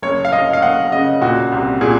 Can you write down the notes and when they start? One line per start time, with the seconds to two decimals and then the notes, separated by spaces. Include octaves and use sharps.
0.02 F#1 C#5
0.25 F5
0.32 F#1 D#5
0.53 F5
0.62 F#1 F#5
0.92 C#3 D#5
1.21 A#2 F#4
1.52 C2
1.81 A#2 G#4